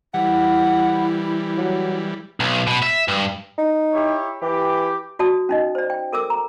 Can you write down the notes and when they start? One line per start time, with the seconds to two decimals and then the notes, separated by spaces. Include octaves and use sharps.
0.14 E3 G3 E4 F#5
1.57 F#3
2.40 B1
2.67 B2
2.83 E5
3.08 G2
3.58 D#4
3.93 E4 G4 C#5
4.42 E3 G4
5.19 F#4 D5 A5 D#6
5.49 C#4 D#4 D#5
5.75 C5 D5
5.90 G5
6.13 A4 A#4 D6 E6
6.30 A#5